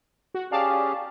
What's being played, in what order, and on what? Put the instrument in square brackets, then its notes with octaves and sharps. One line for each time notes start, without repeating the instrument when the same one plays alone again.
[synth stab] F#4
[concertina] C#4 G4 G#4 [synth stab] D5 F5 A5